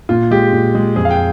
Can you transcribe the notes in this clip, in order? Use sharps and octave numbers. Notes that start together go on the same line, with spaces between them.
A#2 F4
G#3 G4
A#2
G#3
F2 G#4
F5
G5